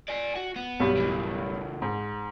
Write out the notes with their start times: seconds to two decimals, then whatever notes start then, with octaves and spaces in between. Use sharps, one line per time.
0.08 D5 G#5
0.35 F#4
0.56 B3
0.80 B1 G2 G3
0.97 C#3 E3
1.82 G#2